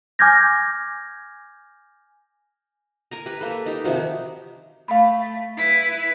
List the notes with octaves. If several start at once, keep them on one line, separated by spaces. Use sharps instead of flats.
G#5 D6 F6 G6 G#6 A#6
A#4 G#5 A#5
G4 B4
A#3 A4 B4
D#4 G4
C3 D#3 F3 F#4
A3 F5 B5
E4 B4